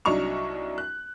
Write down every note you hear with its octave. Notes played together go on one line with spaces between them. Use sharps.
C2 F#3 D4 D#4 C#6 F7
F#6